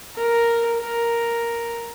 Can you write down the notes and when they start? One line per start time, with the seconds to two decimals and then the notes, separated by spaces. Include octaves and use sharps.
0.16 A#4
0.80 A#4